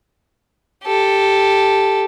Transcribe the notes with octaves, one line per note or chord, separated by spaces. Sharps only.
G4 A4